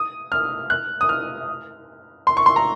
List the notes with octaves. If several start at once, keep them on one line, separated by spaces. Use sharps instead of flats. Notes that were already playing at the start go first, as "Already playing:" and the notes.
Already playing: D#6
F6
F#6
D#6
F6
C6
C#6
C6
A#5